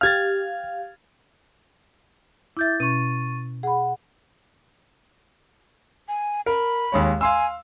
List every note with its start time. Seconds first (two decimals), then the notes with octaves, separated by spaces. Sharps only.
0.01 G4 F5 F6 G#6 A6
2.57 E4 E5 D6 G6 A6
2.80 B2 C#4 C#6 A6 D#7
3.63 G#4 F#5 B5
6.08 G#5
6.46 A#4 B5
6.92 D#2 G#3 C#5
7.21 F5 G#5 C6 E6